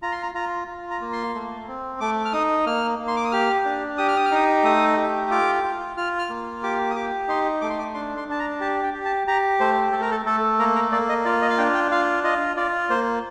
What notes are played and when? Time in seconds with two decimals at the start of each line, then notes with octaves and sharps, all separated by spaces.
0.02 F4 A#5
0.12 C6
0.23 A#5
0.35 F4 A#5
0.68 F4
0.90 A#5
1.01 A#3
1.13 C6
1.35 A3
1.68 C4
2.00 A3 D6
2.25 F6
2.33 D#4 D#6
2.66 A#3 F6
2.99 A#3
3.08 C6
3.16 D6
3.25 D#6
3.32 G4 F6
3.65 D4
3.98 G4 D#6
4.08 F6
4.17 D#6
4.26 F6
4.31 D#4 D#6
4.64 A3 D#6
4.97 G4
5.31 F4 D6
5.63 F4
5.97 F4 F6
6.19 F6
6.30 A#3
6.63 G4 D6
6.91 D#6
6.95 G4 D6
7.28 D#4 C6
7.61 A3 D6
7.70 C6
7.79 D6
7.94 D4 C6
8.17 C6
8.28 D4 A5
8.39 A#5
8.60 G4 A5
8.83 G5
8.94 G4
9.05 A5
9.27 G4 A#5
9.60 A3 C5
9.92 A3 A4
10.02 A#4
10.11 A4
10.25 A3 A4
10.59 A#3 A#4
10.75 A#4
10.92 A#3 D5
11.09 D#5
11.25 F4 D5
11.42 D#5
11.50 F5
11.58 D4 G5
11.75 G5
11.91 F4 F5
12.24 F4 D#5
12.57 F4 D5
12.90 A#3 C5